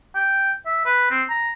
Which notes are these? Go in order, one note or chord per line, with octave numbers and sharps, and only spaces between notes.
G5
E5
B4
C4
A#5